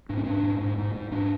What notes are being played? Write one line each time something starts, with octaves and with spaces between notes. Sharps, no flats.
G#2 D4
C#4
G#2 D4
G#2
G#2
G#2
G#2
G#2 D4